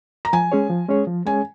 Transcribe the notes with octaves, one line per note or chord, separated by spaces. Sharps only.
A#5
F3 G#5
G#3 C#4 G#4 C#5
F3
G#3 C#4 G#4 C#5
F3
G#3 C#4 G#4 C#5 G#5